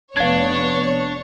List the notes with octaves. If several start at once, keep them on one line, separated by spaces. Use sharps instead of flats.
F1 B3 D4 C#5 F5 G#6